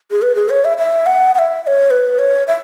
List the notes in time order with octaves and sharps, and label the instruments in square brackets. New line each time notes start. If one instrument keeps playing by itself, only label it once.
[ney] G#4
B4
G#4
C#5
E5
E5
F#5
F#5
E5
E5
C#5
B4
C#5
E5